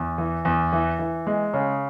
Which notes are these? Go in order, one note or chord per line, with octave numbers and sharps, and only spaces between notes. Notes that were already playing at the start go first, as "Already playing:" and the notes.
Already playing: E2
E3
E2
E3
E3
G#3
C#3